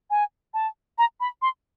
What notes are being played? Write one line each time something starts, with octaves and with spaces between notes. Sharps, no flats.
G#5
A5
A#5
B5
C6